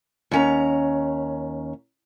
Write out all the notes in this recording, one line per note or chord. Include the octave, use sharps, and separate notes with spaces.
D#2 C#4 A#5